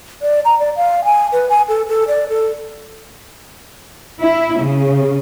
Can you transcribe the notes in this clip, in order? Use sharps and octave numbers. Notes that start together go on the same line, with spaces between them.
D5
A#5
D5
F5
G#5
B4
G#5
A4
A4
D5
A4
E4
C#3